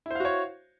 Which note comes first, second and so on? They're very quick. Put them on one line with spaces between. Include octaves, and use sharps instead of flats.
E4 C5 F5 F#4 C#5